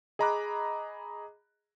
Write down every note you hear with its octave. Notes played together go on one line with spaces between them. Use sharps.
G#4 D#5 A#5 B5 D6 F#6